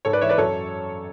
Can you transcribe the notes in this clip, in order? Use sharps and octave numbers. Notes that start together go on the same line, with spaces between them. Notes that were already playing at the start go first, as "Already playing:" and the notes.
G#2 A4 C#5
B4 D5
E3 C#5 E5
B4 D5
F#2 A4 C#5